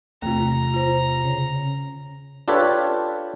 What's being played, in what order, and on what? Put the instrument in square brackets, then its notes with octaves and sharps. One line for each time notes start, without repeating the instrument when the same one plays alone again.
[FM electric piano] E2 C3 [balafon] A3 F4 [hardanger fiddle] A#5
[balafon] F4 C5
[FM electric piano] C#3 C#4
[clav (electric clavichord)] D4 F4 G4 A4 B4 C#5